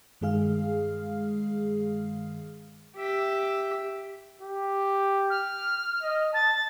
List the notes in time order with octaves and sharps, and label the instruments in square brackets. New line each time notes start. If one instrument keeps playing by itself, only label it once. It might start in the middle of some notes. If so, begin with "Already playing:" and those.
[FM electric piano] G2 D#3 G#3 G#4 F5 F6
[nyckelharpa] G4 E5
[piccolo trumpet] G4
[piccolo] F6
[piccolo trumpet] D#5
[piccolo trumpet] A5 [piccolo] A6